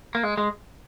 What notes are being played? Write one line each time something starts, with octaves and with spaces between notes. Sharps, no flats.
A#3
G#3
G#3